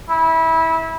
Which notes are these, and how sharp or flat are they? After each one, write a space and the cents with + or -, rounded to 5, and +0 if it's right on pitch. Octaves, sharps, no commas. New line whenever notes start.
E4 -20